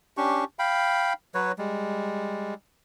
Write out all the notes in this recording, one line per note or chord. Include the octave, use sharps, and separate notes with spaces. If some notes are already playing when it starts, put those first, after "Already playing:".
C#4 D4 G4 C#6
F5 G5 B5
F#3 B4 C#5
G3 G#3